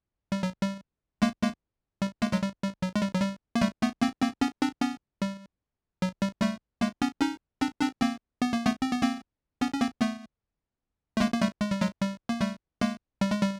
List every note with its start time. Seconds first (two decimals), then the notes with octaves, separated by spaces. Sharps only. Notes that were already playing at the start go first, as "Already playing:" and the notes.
0.32 G3
0.43 F#3
0.62 G3
1.22 G#3 A#3
1.42 G#3 A#3
2.02 G3
2.22 G#3 A#3
2.32 F#3 G#3
2.43 G3
2.63 G3
2.82 F#3
2.96 G#3
3.02 G3
3.14 F#3
3.22 G3
3.55 A#3
3.61 G3 A3
3.81 A3 B3
4.01 A#3 C4
4.22 A#3 C4
4.41 B3 C#4
4.62 C4 D4
4.81 B3 C#4
5.22 G3
6.02 F#3
6.22 G3
6.42 G3 A3
6.81 G#3 A#3
7.02 B3 C#4
7.21 C#4 D#4
7.61 C4 D4
7.81 C4 D4
8.01 A#3 C4
8.42 B3
8.53 A#3
8.66 A3 B3
8.82 C4
8.92 B3
9.02 A#3 C4
9.61 B3 C#4
9.74 C#4
9.81 A#3 C4
10.01 A3 B3
11.17 A3
11.20 G#3 A#3
11.34 A#3
11.41 G3 A3
11.61 G#3
11.71 G3
11.81 F#3 G#3
12.02 G3
12.29 A#3
12.41 G3 A3
12.81 G#3 A#3
13.21 G3
13.31 G#3
13.43 G3